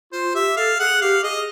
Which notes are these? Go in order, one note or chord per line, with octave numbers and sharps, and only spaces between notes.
F4 C5
G4 E5
A4 F5
G#4 F#5
G4 F5
G#4 D#5